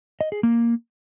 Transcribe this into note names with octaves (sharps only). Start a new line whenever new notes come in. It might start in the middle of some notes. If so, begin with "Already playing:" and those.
D#5
G#4
A#3